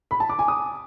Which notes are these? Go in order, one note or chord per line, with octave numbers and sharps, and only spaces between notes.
B5
A5
D6
G#5
D#6